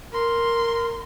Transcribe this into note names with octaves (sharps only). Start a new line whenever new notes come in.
A#4 C6